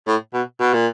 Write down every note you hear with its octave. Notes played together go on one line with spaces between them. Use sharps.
A2
B2
B2
A#2